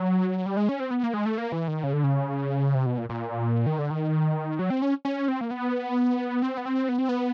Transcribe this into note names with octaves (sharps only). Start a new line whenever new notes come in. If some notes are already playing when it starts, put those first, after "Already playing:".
Already playing: F#3
G3
G#3
C#4
C4
B3
A#3
G#3
A3
A#3
E3
D#3
C#3
D3
C#3
C3
B2
A#2
A#2
D#3
D3
D#3
F#3
C4
C#4
C#4
C4
A#3
B3
C4
B3
C4
B3
C4
B3